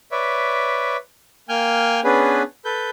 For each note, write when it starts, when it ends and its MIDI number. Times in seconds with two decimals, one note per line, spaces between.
0.12 0.97 71
0.12 0.97 73
0.12 0.97 74
0.12 0.97 76
1.49 2.00 58
1.49 2.00 79
1.49 2.00 80
1.49 2.00 89
1.49 2.00 91
2.04 2.42 59
2.04 2.42 61
2.04 2.42 62
2.04 2.42 68
2.04 2.42 71
2.65 2.90 69
2.65 2.90 71
2.65 2.90 91